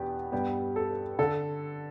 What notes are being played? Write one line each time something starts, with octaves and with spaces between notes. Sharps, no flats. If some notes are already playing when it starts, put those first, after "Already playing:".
Already playing: E2 B2 B3 D4 G4
G2 G3 B3 G4
A4
D3 A4